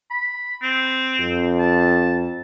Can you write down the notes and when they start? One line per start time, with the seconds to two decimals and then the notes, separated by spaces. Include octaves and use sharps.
0.11 B5
0.62 C4
1.20 F2
1.59 A5